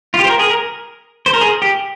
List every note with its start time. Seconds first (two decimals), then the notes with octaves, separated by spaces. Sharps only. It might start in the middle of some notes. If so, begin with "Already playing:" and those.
0.14 F4
0.19 G4
0.25 C5
0.29 A#4
0.39 G#4
0.49 A#4
1.26 C5
1.33 A#4
1.41 G#4
1.62 G4